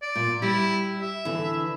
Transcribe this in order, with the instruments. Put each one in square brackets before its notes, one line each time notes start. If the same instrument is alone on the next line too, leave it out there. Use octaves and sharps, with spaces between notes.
[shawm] D5
[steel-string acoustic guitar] A#2
[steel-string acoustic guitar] G3 [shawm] E4
[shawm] E5
[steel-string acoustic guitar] D3 E3